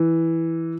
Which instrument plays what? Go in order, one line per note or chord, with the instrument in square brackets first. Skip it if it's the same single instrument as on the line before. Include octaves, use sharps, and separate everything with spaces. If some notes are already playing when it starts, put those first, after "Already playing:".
Already playing: [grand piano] E3